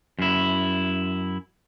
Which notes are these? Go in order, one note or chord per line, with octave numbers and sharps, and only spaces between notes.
F#2 E4